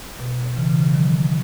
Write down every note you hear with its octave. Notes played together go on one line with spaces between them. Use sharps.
B2
C#3 E3
C#3 E3
C#3 E3
D#3 F#3